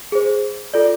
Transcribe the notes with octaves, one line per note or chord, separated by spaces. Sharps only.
G#4 C5
F4 A4 D5